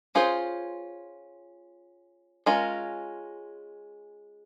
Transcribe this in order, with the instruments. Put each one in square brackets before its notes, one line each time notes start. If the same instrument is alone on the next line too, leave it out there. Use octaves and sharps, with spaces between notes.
[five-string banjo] C#4 F4 G#4 C5
G#3 C#4 F4 A#4